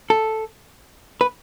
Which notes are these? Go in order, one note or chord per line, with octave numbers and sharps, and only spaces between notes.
A4
B4